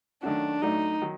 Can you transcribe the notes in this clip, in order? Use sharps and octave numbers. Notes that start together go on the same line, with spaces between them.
D#3 F#3 A3 C#4 D4 F#4
A2 F#3 A3 D4 D#4
D#3 F#3